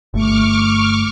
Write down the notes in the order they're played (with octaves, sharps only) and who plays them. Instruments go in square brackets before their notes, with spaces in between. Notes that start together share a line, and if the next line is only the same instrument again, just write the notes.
[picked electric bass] G1 A3 [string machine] C#6 D6 F6